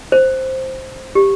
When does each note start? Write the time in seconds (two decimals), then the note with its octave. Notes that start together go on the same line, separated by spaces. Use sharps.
0.12 C5
1.15 G4